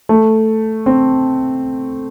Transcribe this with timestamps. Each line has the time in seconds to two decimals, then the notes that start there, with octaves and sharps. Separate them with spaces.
0.09 A3
0.86 C4